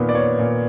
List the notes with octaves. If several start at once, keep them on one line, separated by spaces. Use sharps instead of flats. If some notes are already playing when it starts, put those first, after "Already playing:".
Already playing: A#2 D#3 B3 A#4
D5
B3 C#5
A#2